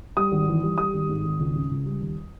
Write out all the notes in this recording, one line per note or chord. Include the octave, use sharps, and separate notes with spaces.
G3 D#6
G#1
E3
G3
G3 D#6
G#1
G#2
G#1
C#2
C#3
C#2
G3
D#2